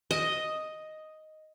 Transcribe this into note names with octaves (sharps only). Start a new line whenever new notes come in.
D#5